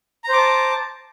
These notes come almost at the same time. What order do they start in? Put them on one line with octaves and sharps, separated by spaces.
A#5 C5 D6 A5